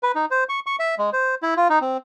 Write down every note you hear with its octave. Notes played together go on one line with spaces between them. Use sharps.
B4
D#4
C5
C#6
C#6
E5
G#3
C5
E4
F4
D#4
C4